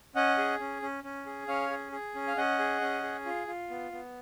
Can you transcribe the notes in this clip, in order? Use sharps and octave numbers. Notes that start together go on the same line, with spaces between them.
C#4 D#5 F#5
G#4
C#4
C#4
C#4
G#4
C#4 C#5 F5
G#4
G#4
C#4
F5
C#4 D#5 F#5
G#4
C#4
G#4
F4
F4
B3
B3